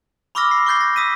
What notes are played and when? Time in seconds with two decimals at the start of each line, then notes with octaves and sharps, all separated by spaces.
0.35 B5 C#6 D6 E6 F6 A#6
0.51 C7
0.66 C#6 D6 F#6 G6 A6 C7
0.81 A#6
0.96 D#6 E6 B6 D#7